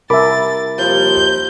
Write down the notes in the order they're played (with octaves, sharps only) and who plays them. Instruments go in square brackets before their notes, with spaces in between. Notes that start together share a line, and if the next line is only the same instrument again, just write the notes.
[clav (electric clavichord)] C2 E5 [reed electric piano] A#4 B5 D6 [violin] A6
[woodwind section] D#2 F3 [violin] G6